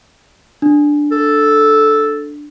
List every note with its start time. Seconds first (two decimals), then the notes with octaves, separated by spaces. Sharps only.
0.62 D4
1.12 A4